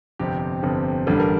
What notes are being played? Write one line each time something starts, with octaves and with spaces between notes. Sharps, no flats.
G1 F2 C3 G4
G1 F2 C3
A1 G2 D3 G3 A4
A#4